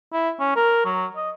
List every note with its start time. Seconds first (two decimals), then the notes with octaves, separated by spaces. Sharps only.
0.13 E4
0.39 C#4
0.56 A#4
0.85 F#3
1.16 D#5